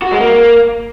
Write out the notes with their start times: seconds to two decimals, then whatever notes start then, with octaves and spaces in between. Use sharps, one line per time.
0.02 F#4
0.11 G#3
0.20 A#3